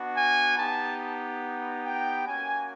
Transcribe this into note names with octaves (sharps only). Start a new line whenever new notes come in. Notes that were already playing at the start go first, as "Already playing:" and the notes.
Already playing: B3 D4 F#4
G#5
B3 D#4 G4 A5
G5
A#3 C#4 F#4 G#5